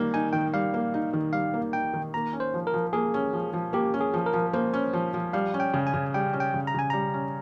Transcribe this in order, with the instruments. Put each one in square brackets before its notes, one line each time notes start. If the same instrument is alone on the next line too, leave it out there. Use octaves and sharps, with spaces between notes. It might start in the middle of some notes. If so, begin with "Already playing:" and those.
Already playing: [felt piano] D#3 G3 A#3
[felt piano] D#4 [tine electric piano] G#5
[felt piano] D#3 [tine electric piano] G5
[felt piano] G3 [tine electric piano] F5
[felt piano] A#3
D#4
D#3
[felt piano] G3 [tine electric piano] F5
[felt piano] A#3
[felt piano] D#4 [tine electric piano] G5
[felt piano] D#3
[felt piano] A#3 [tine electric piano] A#5
[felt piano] C#4
[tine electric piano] C5
[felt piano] F3
[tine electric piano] A#4
[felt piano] F3
[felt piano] A#3 [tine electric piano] G#4
[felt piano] C#4
F3
F3
[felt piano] A#3 [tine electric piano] G4
[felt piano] C#4
[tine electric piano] G#4
[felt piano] F3
[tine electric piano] A#4
[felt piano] F3
[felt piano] A#3 [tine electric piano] C5
[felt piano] C#4
F3
F3
[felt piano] G3 [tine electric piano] F5
[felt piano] C#4
[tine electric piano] G5
[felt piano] C#3
[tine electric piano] G#5
[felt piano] C#3
[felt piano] G3 [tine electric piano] G5
[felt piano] C#4
[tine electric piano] G5
[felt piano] C#3
[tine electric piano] A#5
[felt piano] C#3 [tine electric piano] G#5
[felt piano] G3 [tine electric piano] A#5
[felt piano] C#4